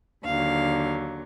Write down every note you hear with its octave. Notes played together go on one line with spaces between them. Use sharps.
D#2 D3 F#3 F5